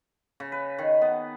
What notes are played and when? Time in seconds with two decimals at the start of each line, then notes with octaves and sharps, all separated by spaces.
0.40 C#3
0.52 B4
0.79 D#3
1.01 B3